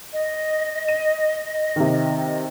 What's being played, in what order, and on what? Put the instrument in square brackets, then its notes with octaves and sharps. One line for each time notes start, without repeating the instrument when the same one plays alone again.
[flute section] D#5
[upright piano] D#7
C3 D#3